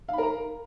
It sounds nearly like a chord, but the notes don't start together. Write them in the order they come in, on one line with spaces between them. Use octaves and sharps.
F5 B5 A#4 A#5